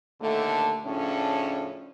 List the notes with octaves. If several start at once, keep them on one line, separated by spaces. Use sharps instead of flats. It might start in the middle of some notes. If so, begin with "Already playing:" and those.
D#2 A#2 D3 A3
A2 C#3 F3 C#4 D4